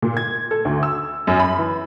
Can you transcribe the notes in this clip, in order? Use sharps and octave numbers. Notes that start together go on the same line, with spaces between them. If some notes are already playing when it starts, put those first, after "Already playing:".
A#2
G#6
A4
D2
E6
F#2
B5
E3